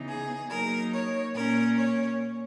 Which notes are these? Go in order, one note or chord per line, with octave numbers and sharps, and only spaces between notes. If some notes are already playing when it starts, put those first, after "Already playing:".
Already playing: C#3 E3 B3 D#4
G#4
F#3 A#3 D#4 A#4
C#5
A#2 A#3 C#4 A#4
C#5